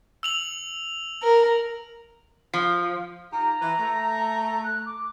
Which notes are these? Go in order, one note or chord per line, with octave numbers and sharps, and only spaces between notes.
E6 F7 F#7
A#4
F3
D#4 F4 G4 A#5
E3 B4
A3
F#6
D6